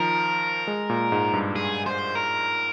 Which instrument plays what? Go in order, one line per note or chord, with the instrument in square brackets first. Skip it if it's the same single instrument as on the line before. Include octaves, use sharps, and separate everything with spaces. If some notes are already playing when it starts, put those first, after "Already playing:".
Already playing: [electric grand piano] D#3 F3 [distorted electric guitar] A#4
[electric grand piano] G#3
A#2
G#2
G2
[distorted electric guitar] G#4
C5
A#4